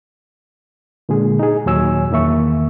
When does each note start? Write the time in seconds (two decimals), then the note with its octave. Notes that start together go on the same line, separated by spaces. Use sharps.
1.09 A#2 D3 G#3 G#4
1.39 D#4 G#4
1.66 D#2 A#2 F#3 C#5 G#5 E6
2.11 E2 D#3 A#3 E5 C#6